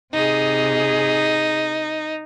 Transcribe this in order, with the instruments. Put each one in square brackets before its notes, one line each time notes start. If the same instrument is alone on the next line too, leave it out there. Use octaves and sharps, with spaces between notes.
[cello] C3 G#4 [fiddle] D#4